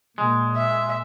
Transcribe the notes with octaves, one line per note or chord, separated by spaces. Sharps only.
A#2 G#3
E5